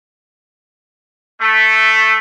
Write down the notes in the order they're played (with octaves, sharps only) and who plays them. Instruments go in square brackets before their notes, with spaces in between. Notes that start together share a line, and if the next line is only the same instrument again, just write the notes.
[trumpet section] A3